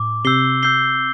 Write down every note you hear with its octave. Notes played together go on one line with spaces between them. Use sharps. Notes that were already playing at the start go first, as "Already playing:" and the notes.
Already playing: A2 D6
C3 E6 G6 C7 G7
E6 G6 C7 G7